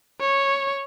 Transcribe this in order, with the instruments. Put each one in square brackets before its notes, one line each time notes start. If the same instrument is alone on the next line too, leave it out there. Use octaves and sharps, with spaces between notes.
[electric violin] C#5